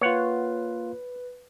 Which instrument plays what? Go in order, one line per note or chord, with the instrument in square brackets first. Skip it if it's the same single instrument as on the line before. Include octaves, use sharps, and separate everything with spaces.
[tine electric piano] A#3 F4 [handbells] B4 [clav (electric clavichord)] C#5 F#5